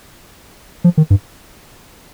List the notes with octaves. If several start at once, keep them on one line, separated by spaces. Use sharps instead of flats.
F3
D#3
G2